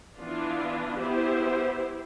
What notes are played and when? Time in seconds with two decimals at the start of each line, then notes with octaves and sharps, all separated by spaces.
0.18 E3 B3 D4 F4
1.00 B3 E4 G4 C5